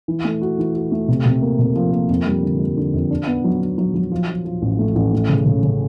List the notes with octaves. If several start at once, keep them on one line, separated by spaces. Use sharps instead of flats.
E3
A3
F#4
E3
F#4
A3
C3
C3
A#3
C3
F3
A#3
F2
G3
D3
G3
D3
F2
D4
B3
F#3
B3
F#3
F#3
F3
F3
F3
A1
A3
A1
A3
C#3
C#3
C#3